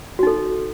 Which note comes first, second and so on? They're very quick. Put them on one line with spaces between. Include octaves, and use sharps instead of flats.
F#4 D#4 A4